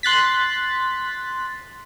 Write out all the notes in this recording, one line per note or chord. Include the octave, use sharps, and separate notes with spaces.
C6 F#6 A6 B6